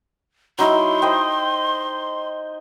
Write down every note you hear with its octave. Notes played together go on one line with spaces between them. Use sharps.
F#3 D#4 E4 C6
C5 D#5 G5